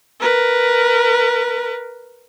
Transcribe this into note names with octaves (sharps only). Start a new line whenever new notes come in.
A#4 B4